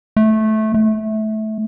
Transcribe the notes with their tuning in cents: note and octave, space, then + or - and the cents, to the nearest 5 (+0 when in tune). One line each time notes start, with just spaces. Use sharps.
A3 -15
A3 -20